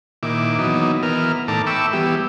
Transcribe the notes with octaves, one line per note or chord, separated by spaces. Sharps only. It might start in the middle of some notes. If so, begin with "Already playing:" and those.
A#2 D#3 E4 D6
D#3 E3 F#3 B3 D#4
E3 B3 A#4 F6
A2 D#3 A4 A5 A#5 D6
E5 G5 B5 C#6 D6 E6
E3 G3 B3 G4